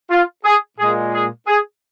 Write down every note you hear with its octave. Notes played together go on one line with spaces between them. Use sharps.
F4
G#4
A#2 G#3 G#4
G#4
G#4